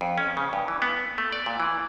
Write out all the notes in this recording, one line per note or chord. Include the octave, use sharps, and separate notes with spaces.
F2
C#4
C#3
G2
E3
B3
A3
D5
A#2
E3